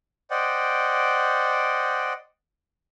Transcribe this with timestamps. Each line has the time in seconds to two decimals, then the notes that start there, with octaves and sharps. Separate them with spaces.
0.30 C5 D5 D#5 F#5 G5